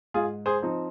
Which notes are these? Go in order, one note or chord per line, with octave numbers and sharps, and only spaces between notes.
G#2 F4 G#4
G#4 C5
F3 C4 D#4